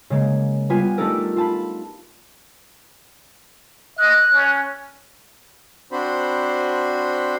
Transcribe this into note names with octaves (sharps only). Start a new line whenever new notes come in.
C#3 G#3 A#3
G3 B3 F4 G#5
A3 D4 D#4 G4 A4 A#4
F4 A5 B5
D#5 F#6
C#4
C4 D4 F#4 C5 B5